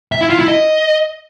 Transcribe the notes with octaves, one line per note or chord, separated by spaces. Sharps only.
E5
E4
F4
E4
D#5